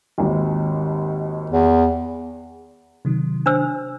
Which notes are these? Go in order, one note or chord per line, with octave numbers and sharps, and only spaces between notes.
G#1 D#2
E2
C3 D#3 F#3
D4 C5 E6